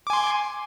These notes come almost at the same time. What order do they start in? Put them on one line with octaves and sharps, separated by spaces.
D6 G#5 C6